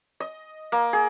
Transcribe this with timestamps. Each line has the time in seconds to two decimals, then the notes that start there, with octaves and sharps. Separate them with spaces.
0.20 D#5
0.72 A#3
0.93 G#4